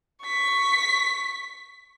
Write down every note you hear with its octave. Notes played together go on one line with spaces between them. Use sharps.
C#6 B6